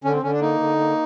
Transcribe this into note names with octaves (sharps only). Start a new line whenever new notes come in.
D3 C#4
C4
D3 C#4
D4
A#3 D#4
D3
A#3